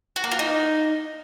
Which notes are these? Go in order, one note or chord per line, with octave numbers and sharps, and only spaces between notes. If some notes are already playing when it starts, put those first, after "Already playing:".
F#4
A#3
F4
D#4